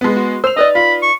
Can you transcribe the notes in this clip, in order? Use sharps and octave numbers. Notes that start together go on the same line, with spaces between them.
G#3 B3
F#4
C5 E6 F7
D#4 B4 D5 D#5
F4 B5
C#6